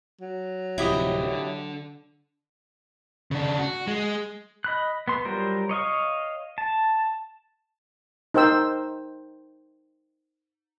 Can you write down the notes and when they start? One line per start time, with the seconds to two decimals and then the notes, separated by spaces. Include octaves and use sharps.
0.21 F#3
0.78 D1 C3 F3 E4 G4 D#5
1.23 D3
3.31 C#3 D4
3.59 F#4
3.87 G#3
4.64 D#5 B5 F#6
5.08 B3 C6
5.25 F#3 G3 F4 A#4 C5
5.69 C#5 D#5 F5 C#6
6.58 A5
8.34 D#4 A#4 C5 G5 E6